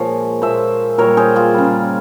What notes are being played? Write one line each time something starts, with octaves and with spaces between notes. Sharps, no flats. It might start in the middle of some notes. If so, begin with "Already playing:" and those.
Already playing: A#2 F3 G#3 C#5 F5
A#2 F3 G#3 C5 E5
A#2 G3 A#4 C#5
G#4 C5
F4 G#4
C#3 G3